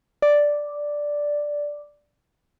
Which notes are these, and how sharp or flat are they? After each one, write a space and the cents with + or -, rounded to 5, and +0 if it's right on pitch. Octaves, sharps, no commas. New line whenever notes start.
D5 +0